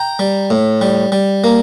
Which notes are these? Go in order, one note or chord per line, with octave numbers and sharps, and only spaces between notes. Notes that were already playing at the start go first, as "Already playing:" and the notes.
Already playing: G5 A#5
G3
A2
G3
G3
A#3